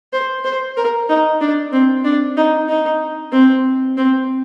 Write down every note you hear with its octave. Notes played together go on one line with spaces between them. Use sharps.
C5
C5
A#4
D#4
D4
C4
D4
D#4
D#4
C4
C4